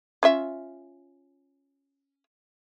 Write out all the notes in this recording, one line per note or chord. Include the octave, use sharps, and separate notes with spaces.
C#4 F4 E5